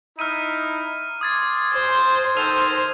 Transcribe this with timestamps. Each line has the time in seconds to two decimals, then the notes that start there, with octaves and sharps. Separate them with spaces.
0.19 D#4 E4 F6 D#7
1.21 C6 D6 D#6 G#6 A6
1.74 C5
2.37 D#3 A4 C5 F6 D#7 F7